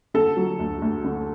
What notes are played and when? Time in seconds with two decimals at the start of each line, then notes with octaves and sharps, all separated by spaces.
0.14 D3 A4
0.37 F#3
0.59 D2
0.82 D2
1.04 D3